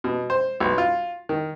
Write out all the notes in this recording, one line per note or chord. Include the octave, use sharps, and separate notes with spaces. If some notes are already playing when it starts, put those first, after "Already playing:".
B2
C5
B1
F4
D#3